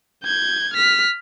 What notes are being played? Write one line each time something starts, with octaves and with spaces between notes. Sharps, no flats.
G6 G#6
F6 B6